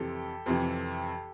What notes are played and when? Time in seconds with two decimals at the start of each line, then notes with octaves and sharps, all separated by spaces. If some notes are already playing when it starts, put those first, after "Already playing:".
Already playing: F2 C3 E3 G4 A4
0.46 F2 C3 E3